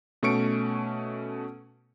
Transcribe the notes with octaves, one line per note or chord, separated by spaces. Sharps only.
B2 A3 C#4 C#6 C#7 D7